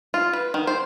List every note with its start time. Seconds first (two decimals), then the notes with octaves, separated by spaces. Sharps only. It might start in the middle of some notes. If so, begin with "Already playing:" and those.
0.14 F4
0.33 B4
0.54 D#3
0.67 C5